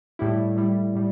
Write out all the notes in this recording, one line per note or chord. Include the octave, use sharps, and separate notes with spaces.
A2 G3 E4
A2 G3 E4
A2 G3